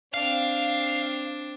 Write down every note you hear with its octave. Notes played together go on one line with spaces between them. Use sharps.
C4 D4 F5